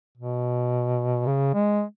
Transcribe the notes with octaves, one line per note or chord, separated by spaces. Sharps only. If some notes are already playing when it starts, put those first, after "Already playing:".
B2
C#3
G#3